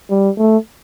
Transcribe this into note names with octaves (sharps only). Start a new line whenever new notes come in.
G3
A3